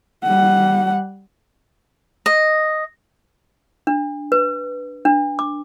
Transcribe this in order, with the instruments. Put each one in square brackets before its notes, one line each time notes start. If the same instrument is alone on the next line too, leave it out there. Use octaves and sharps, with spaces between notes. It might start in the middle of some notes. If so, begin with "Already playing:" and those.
[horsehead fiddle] G3 F#5
[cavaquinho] D#5
[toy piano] D4
B4
D4
D6